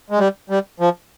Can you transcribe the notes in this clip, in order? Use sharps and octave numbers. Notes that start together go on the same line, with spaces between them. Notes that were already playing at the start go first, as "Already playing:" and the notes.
G#3
G3
G3
F3